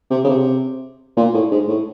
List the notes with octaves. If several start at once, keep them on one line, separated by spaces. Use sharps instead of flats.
C3
C#3
C3
A#2
A2
G#2
A2